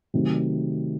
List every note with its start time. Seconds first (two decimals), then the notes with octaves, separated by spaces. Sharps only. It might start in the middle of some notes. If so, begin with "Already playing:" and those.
0.14 C3 D#3 F#3 A3